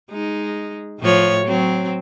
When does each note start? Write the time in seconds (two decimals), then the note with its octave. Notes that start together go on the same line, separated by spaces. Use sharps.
0.10 G#3 D#4
1.00 A2 F3 C#5
1.45 F#3 C4